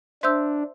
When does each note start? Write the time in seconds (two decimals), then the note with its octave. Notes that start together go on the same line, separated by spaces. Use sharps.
0.23 D4 C5 E5 C6 E6 G6